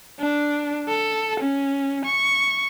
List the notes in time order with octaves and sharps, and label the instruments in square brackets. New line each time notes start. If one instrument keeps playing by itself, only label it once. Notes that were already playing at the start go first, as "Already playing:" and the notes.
[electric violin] D4
A4
C#4
C#6